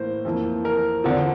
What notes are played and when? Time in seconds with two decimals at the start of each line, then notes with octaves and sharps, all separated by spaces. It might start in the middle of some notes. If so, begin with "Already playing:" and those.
Already playing: A2 E3 A#3 C5
0.25 F2 E3 A#3
0.65 A#4
1.04 E2 D3 F3 C4